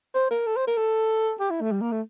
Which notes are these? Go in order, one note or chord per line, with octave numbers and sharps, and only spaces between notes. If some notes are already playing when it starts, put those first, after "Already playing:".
C5
A#4
A4
C5
A#4
A4
G4
E4
A3
G3
A#3
A3